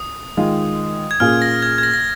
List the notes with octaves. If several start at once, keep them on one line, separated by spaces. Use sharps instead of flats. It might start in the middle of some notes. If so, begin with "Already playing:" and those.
Already playing: D#6
D#3 G#3 F4
G#6
A#2 A#3 C#4 F4 G#4 F6
A#6
G#6
G#6
A#6
A#6